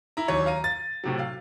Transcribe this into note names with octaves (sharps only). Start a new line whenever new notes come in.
E4 A#5
D#2 F#3 C#5 C#6
F5 A#5 D#7
A6
A2 C3 F#3
F5